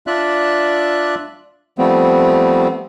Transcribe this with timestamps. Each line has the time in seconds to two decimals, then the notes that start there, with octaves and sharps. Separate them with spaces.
0.07 D4 F4 D5 E5 F#6
1.78 F3 G3 A3 B3 C4